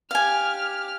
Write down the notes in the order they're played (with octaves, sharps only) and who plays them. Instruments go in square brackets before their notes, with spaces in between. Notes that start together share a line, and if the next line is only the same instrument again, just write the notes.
[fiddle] G4 F6 [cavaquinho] F5 G#5